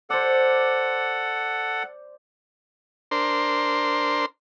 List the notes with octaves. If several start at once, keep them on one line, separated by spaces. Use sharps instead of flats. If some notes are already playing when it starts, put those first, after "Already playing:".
A4 C5 D5 F#5
D4 A#4 C5 C6